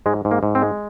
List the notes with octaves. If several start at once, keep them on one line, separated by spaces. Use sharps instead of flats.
G#2 G#3
G#2
A#3
G#2
C4
G#3